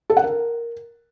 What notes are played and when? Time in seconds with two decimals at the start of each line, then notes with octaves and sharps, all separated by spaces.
0.10 A4
0.17 F#5
0.24 A#4